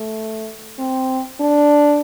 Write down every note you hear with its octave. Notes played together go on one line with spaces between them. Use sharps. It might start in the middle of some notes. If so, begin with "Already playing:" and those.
Already playing: A3
C4
D4